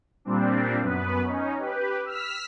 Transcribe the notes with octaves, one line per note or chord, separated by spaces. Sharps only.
A#2 G3 C4 D4
F#2 B3 B4
C#4 D#4
G4 B4
E6 F6 B6